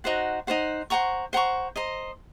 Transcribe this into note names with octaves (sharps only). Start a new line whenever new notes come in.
D#4 F#4 C5 F#5
D#4 F#4 C5 F#5
C5 F#5 A#5 C#6
C5 F#5 A#5 C#6
C5 D#5 A#5